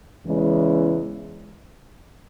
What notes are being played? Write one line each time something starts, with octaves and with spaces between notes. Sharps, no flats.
E2 C#3 E3 G#3